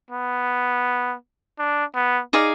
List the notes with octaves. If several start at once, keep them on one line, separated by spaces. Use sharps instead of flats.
B3
D4
B3
D#4 G#4 D5 F5